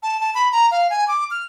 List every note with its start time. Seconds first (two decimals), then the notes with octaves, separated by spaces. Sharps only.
0.03 A5
0.21 A5
0.35 B5
0.52 A#5
0.71 F5
0.90 G#5
1.08 D6
1.31 F6